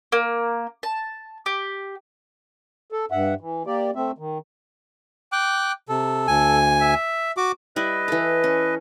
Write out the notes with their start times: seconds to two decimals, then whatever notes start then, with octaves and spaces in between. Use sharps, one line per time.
0.12 A#3
0.83 A5
1.46 G4
2.92 A4
3.11 G2 E5 F#5
3.41 E3
3.66 A#3 G4 D5
3.95 A3 C4 E5
4.18 D#3
5.32 G5 D6 F#6
5.89 C3 A4
6.27 D2 G#5
6.80 E5
7.37 F#4 D6
7.76 G3 E4 B4 D#5
8.08 E3 A4
8.44 C#4